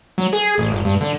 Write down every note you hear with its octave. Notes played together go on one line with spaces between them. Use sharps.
F#3
G#4
A1
G1
G2
D3